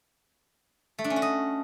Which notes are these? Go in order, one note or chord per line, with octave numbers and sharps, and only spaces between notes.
A3
D4
C#4
F#4
D#5